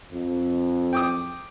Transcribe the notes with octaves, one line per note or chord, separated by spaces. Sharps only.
F2
G5 D6 D#6